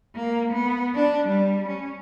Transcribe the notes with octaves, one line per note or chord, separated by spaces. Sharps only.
A#3
B3
D4
G3
C#4